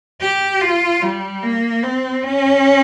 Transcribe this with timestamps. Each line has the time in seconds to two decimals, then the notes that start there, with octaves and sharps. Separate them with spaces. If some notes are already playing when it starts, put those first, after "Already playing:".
0.21 G4
0.61 F4
1.02 G3
1.43 A#3
1.83 C4
2.23 C#4